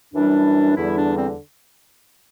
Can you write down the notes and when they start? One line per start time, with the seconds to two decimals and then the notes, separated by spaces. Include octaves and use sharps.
0.13 F#2 E3 G3 D4
0.76 E2 D3 G3 E4
0.97 D4
1.18 C4